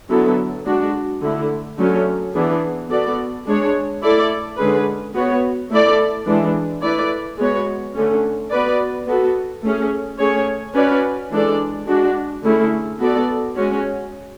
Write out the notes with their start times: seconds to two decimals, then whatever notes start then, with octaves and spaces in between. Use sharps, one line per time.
0.09 D3 F#3 B3 E4 A4
0.65 G#3 D4 F#4
1.21 D3 A3 E4
1.77 D3 F#3 A3 C#4
2.33 E3 B3 D4 G#4
2.89 B3 F#4 A4 D5
3.46 G#3 D4 G#4 C#5
4.01 A3 E4 A4 D5
4.57 D3 G#3 C#4 G#4 B4
5.14 B3 F#4 C#5
5.70 A3 E4 A4 D5
6.26 E3 G#3 D4
6.82 A3 E4 B4 D5
7.38 G#3 B3 F#4 C#5
7.94 D3 A3 C#4
8.50 B3 F#4 B4 D5
9.06 B3 F#4 A4
9.62 A3 C#4 G#4
10.19 A3 C#4 G#4 C#5
10.74 C#4 F#4 B4 D5
11.31 E3 G#3 D4 A4 D5
11.87 G#3 D4 F#4
12.43 D3 A3 C#4 E4 G#4
12.99 B3 F#4 A4 D5
13.55 G#3 C#4 F#4